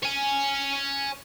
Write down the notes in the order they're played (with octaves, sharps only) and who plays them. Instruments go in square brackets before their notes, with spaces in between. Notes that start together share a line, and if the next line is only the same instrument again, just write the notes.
[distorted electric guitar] C#5 G#5